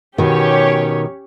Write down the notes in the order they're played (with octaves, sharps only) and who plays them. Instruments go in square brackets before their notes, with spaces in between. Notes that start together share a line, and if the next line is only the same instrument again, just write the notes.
[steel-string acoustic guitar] B2 D#3 [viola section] C#4 G4 C#5